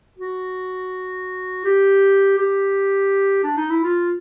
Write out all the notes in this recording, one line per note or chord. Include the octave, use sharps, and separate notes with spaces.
F#4
G4
G4
D4
D#4
E4
F4